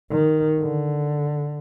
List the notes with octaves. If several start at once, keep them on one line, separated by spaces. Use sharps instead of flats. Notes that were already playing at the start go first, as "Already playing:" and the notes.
D#3
D3